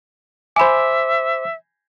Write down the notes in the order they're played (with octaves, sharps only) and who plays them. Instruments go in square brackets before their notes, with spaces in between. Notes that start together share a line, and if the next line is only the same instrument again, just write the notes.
[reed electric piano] C5 D6 [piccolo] E5 [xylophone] G#5 B5